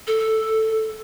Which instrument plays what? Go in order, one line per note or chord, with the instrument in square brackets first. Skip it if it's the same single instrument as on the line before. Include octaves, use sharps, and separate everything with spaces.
[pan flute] A4